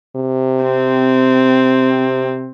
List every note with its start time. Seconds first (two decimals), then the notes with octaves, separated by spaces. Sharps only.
0.16 C3
0.63 C4